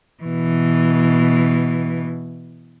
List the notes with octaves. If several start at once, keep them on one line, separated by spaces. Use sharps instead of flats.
B2 E3